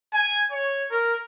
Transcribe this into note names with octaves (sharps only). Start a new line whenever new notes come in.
G#5
C#5
A#4